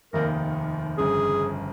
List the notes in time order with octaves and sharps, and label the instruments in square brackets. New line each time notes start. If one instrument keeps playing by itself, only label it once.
[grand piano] F1 D#2 D#3 A#3 [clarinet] A#4
[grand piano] G1 F2 C#3 [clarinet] G#4